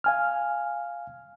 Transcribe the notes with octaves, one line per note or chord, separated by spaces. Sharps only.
F5 G#5 F6